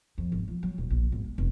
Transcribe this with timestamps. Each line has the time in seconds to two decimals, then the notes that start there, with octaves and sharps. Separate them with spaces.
0.18 F2
0.32 G#1
0.48 F3
0.63 F#3
0.78 D#1
0.90 A#1
1.12 G#1
1.24 G#3
1.38 F1